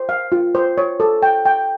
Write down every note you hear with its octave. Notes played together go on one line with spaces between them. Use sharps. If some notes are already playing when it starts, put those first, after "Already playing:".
Already playing: C5
F5
F4
C5
C#5
A4
G5
G5